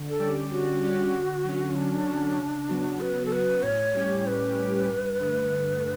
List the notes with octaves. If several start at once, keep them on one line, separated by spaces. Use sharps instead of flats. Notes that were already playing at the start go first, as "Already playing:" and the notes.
Already playing: D3
A4
G3 C#4 G4 D5
D3 F#4
G3 C#4 G4 D5
D3
F#3 C#4
D3 D4
F#3 C#4
C#3
F#3 B3 F#4
C#3 B4
A4
F#3 B3 F#4 B4
A2 C#5
G3 C#4 G4
A2 B4
G3 C#4 G4
G2
D3 A3
G2